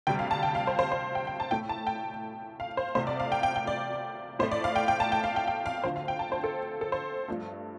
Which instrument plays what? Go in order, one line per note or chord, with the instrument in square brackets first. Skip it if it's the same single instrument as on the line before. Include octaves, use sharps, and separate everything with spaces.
[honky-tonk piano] D2 C3 G3 G5
F5
A5
G5
F5
C5
C5
C5
G5
G5
A5
A2 A3 G5
A5
G5
F5
C5
C2 C3 A3 C5
D5
F5
G5
G5
G5
D5
A2 C5
A3
D5
F5
G5
G5
A5
G5
F5
G5
G5
F5
D2 D3 F3 C5
F5
G5
A5
C5
A4
A4
C5
G2 F3 A3